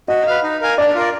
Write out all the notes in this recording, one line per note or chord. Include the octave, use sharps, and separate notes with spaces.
F#4 D#5
B4 F5
D#4
A#4 F5 G#5
D4 D5
F4 A#4 D5